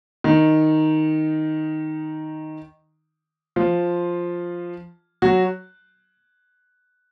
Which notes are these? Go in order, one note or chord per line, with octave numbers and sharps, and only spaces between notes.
D#3 D#4
F3 F4
F#3 F#4